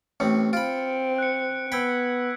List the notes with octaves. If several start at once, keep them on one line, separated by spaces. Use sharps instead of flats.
A1 A2 C4 C#7
C4 F4 B5 D7
F#6 C#7
B3 G5 B5 E6 G#6 B6